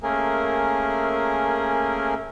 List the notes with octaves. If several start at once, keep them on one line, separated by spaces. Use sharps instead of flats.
A3 A#3 C#4 G#4 A#4